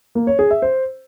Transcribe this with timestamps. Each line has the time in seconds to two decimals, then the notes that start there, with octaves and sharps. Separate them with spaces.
0.15 A#3
0.27 C#5
0.39 G#4
0.51 E5
0.62 C5